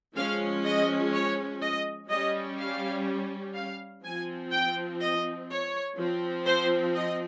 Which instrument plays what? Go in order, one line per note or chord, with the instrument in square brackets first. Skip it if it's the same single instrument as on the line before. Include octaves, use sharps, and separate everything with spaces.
[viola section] F3 G#3 C#4 F5
D#5
C#5
D#5
G3 C#4 D#5
F5
F5
F3 C4 G#5
G5
D#5
C#5
F3 C4
C5
D#5